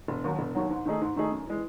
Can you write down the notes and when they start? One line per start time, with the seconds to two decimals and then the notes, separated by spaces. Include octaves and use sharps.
0.08 E1
0.24 D#2 D#3 F#3
0.39 E1
0.55 D#2 D#3 F#3
0.70 G#2
0.85 D#3 A3 D#4 G#4
1.01 G#2
1.16 D#3 A3 D#4 G#4
1.31 F#2
1.47 E3 G#3